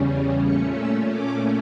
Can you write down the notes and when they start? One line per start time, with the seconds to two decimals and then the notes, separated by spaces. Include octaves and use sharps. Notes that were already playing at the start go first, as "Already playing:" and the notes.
Already playing: E2 C#3 G3 C#4
0.43 A#2 A3 C#4 C#6
0.76 E6
1.09 D6